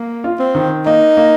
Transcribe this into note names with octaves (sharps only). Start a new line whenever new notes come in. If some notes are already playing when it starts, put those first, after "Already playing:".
Already playing: A#3
F4
C4
D#3
A#3 D#4
A#3